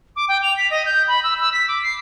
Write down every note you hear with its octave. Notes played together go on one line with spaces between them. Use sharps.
D6
G5
F7
B6
D#5
G6
B5
E6
E6
B6
D6
C7